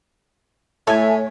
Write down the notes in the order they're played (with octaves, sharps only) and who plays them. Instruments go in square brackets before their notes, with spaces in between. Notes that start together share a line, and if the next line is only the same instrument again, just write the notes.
[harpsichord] A2 [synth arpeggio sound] A4 G#5 [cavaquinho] C#5 [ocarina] E5